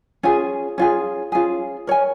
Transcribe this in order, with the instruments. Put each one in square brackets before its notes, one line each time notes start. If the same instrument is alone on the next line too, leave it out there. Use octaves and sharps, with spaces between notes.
[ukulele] C#4 F4 G#4
C#4 F4 G#4
C#4 F4 G#4
A#4 C#5 G#5